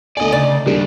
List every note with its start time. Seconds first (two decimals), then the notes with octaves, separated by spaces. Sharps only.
0.17 D2 D5 D#5 G#5
0.32 C#3 D#4 D5
0.66 D#2 G3 D4 G4